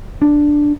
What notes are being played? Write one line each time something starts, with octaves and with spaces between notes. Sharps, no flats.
D4